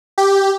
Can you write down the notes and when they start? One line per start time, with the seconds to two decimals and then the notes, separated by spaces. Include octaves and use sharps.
0.18 G4